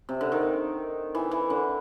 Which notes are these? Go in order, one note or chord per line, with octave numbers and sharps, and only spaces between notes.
C3
D3
D#3
E3
E3
D3